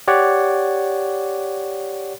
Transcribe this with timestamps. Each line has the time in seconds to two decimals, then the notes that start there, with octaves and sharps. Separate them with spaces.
0.08 G4 C#5 D5 F#5